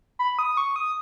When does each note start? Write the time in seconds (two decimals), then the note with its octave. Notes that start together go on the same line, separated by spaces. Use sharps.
0.19 B5
0.39 D#6
0.57 C#6
0.76 D#6